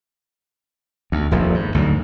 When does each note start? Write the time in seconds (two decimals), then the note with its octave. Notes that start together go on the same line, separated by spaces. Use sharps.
1.12 D2
1.31 D#1 A#1 F2
1.54 G#2
1.75 D2 G#2 F#3